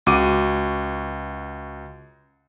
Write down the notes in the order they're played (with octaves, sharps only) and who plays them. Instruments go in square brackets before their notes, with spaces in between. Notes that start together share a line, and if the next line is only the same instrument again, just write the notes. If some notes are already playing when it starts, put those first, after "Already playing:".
[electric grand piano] C#2 F#4 D6 D#7